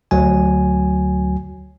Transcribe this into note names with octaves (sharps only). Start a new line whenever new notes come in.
D2 F#3 G#5